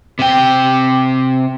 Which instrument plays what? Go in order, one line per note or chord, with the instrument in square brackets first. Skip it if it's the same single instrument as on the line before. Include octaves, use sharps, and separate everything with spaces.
[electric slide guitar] C3 G5